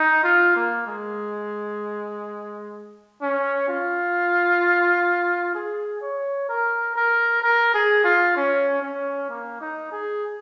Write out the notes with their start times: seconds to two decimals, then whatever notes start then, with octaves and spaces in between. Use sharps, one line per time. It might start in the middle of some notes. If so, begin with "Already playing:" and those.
Already playing: D#4
0.24 F4
0.56 A#3
0.87 G#3
3.21 C#4
3.68 F4
5.55 G#4
6.02 C#5
6.49 A#4
6.96 A#4
7.42 A#4
7.74 G#4
8.04 F4
8.36 C#4
8.82 C#4
9.30 A#3
9.61 D#4
9.92 G#4